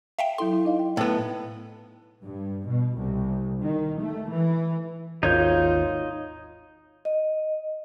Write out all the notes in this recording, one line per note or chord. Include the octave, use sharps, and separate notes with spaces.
E5 F5 G5
F#3 E4 A4 C6
E4
D#4 D#5 F5
G5
A2 B3
G2
B2
C2
D#3
A3
E3
G#1 D#2 D#4 F4 C#5 G6
D#5